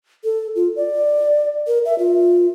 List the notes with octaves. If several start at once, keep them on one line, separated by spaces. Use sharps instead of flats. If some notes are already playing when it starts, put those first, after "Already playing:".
A4
F4
D5
A#4
E5
F4